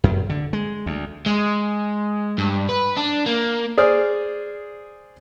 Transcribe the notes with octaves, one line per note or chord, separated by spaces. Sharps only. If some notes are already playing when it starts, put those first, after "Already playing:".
F#2
D3
G#3
D2
G#3
G2
B4
D4
A#3
G#4 C5 D5 D#6 F6